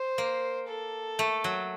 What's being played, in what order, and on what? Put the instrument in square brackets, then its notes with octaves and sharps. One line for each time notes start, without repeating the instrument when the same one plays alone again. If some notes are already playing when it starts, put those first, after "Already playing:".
Already playing: [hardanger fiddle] C5
[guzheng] A#3
[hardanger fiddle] A4
[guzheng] A3
F#3